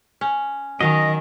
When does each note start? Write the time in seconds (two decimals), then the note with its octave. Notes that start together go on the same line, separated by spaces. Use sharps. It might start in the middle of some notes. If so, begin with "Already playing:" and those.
0.21 C#4
0.81 D#3 F#3 C#4 D#5